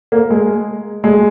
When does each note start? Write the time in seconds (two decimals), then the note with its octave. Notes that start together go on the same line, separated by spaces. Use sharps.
0.12 A#3
0.30 G#3
1.04 G#3